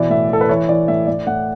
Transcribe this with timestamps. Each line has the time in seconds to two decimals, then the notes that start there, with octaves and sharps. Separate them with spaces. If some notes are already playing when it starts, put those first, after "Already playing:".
Already playing: B2 E3 D5
0.10 A2 E5
0.30 E3 A4
0.41 B4
0.49 E3 C#5
0.69 E3 D5
0.88 A2 E5
1.07 A2 D5
1.27 A2 F#5